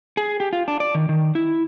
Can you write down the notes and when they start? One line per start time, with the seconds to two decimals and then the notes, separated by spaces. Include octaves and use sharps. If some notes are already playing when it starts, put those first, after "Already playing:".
0.17 G#4
0.40 G4
0.53 F4
0.68 D4
0.80 D5
0.95 D#3
1.09 D#3
1.35 E4